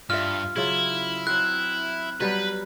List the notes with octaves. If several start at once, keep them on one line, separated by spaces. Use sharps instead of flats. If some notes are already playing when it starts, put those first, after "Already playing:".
G2 F4 E5 F6
C#3 F#3 E4 F4
F#3 C4 F#6
F#3 G3 B3 B4